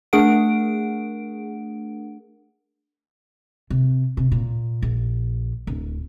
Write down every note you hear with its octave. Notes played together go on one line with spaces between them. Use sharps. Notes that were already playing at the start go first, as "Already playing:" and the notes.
A3 D4 G#4 A#4 F#5 D7
C3
C3
A#2
A#1
D1